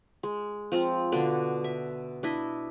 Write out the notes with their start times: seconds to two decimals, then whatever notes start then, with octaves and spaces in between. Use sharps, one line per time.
0.23 G#3
0.72 F3 C4 F4
1.12 B2 D3 D4
1.64 E5
2.23 D4 E4 D#5 E5